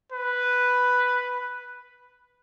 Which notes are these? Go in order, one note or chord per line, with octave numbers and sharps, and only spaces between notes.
B4